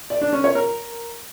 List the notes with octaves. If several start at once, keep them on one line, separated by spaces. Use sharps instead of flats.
D5
D4
C#4
C#5
A#4